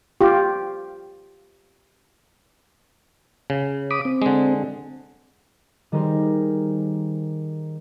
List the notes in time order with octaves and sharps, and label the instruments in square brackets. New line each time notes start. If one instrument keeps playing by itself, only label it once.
[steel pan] F4 G4
[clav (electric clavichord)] C#3
[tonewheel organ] B5 D6 D#6
C4
[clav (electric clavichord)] D3 G#3
[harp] D#3 G3 D#4 G#4 A#4 C5